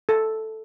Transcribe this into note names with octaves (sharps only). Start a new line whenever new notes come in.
A4